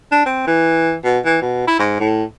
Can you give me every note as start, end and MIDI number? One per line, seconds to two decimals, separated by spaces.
0.12 0.24 62
0.26 0.47 60
0.47 0.95 52
1.04 1.19 47
1.25 1.41 52
1.42 1.64 47
1.67 1.75 64
1.79 1.97 44
2.00 2.24 45